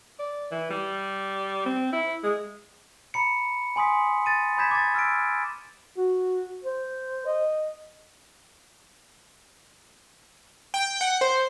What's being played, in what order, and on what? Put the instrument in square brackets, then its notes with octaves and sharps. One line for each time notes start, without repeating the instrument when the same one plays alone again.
[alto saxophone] D5
E3
G3
C4
E4
G#3
[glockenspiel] A#5 B5 C#7
G#5 C6 D#6 B6
A6 D#7
B5 D#6 G6 G#6 B6 E7
D6 A6
E6 F6 B6 D7
[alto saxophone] F#4
C5
D#5
[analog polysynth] G5
F#5
C5